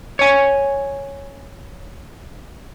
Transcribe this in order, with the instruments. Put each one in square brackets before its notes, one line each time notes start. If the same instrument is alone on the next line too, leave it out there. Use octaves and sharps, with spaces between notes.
[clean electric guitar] C#5 G#5